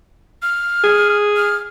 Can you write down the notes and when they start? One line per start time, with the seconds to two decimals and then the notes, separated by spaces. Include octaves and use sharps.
0.42 F6
0.84 G#4
1.36 F6